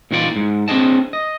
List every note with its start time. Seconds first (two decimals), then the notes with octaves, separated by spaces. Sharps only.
0.11 A#2 E3 D#4 F4 G#4 D5
0.36 G#2
0.68 C4 D4 G#4 D#5 A5
1.13 D#5